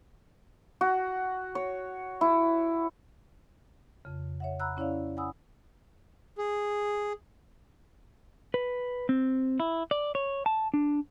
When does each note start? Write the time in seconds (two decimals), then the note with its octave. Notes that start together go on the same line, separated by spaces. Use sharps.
0.81 F#4
1.55 C#5
2.21 E4
4.05 F2 C#3
4.40 C#5 E5 F#5
4.60 F#5 A#5 B5 E6 F#6
4.77 C#4 E4 C#5 D5 F5
5.17 F#5 G#5 B5 D#6 E6
6.38 G#4
8.54 B4
9.09 C4
9.60 E4
9.91 D5
10.15 C#5
10.46 A5
10.74 D4